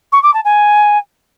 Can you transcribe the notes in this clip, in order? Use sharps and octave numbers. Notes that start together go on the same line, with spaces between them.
C#6
D6
A5
G#5